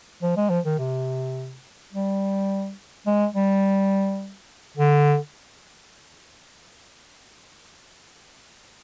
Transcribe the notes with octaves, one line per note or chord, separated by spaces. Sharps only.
F3
G#3
F3
D#3
C3
G3
G#3
G3
D3